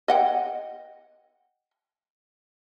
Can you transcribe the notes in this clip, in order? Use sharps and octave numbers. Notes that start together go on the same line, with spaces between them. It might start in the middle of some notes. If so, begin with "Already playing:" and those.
D#5 F#5 G5